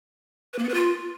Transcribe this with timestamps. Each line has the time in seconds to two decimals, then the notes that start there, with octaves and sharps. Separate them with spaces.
0.53 B4
0.59 A#3
0.64 B3
0.69 B4
0.74 F4